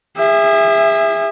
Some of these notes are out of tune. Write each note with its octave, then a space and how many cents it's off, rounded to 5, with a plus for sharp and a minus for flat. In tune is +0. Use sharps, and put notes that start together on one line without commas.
G#4 -35 E5 +0